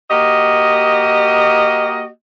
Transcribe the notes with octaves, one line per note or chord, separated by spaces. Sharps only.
A#3 F#4 G4 D#5